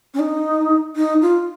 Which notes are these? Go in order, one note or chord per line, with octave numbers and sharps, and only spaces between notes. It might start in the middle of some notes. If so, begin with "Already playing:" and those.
C#4
D#4
D#4
F4